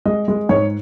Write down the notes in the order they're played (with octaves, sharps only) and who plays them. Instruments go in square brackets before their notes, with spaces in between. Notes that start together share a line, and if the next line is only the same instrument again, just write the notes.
[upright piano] G#3 D#5
G#3
G#2 C#5